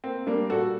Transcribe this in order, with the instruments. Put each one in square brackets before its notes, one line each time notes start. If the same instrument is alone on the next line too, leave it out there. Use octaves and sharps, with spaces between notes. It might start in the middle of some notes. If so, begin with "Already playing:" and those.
[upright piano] A#3 C4
G3 A#3 D4
A#2 F#4 A4